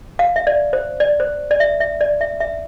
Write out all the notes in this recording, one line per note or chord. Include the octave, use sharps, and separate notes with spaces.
F5
E5
D5
C5
D5
C5
D5
E5
E5
D5
E5
E5